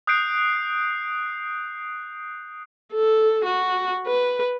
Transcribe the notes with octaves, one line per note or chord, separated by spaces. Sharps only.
D#6 F#6 G6 C7 D7
A4
F#4
B4